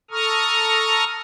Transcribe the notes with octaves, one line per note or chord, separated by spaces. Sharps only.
A4 A#5 C#6 D#6 F6